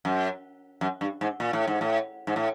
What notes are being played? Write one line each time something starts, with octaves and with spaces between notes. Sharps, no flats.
F#2
F#2
G2
G#2
A#2
A2
G#2
A2
G#2
A2